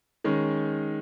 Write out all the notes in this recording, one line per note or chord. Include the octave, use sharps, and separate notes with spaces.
D#3 G#3 C#4